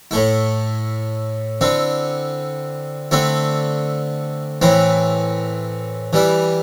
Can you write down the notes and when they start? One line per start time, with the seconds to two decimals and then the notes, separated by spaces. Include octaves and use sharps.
0.11 A2 A3 E4
1.61 D3 C4 E4
3.11 D3 A3 C4 E4
4.62 A2 E3 C4 E4
6.13 E3 G3 E4